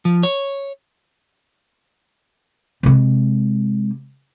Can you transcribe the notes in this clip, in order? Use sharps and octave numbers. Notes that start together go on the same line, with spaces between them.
F3
C#5
C3 G#3